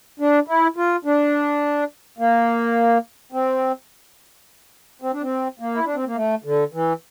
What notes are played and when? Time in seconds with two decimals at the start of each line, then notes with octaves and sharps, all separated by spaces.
0.20 D4
0.48 E4
0.76 F4
1.05 D4
2.18 A#3
3.32 C4
5.02 C4
5.12 D4
5.22 C4
5.60 A#3
5.74 E4
5.85 D4
5.94 C4
6.06 A#3
6.15 A3
6.44 D3
6.73 E3